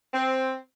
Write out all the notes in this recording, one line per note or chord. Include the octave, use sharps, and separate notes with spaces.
C4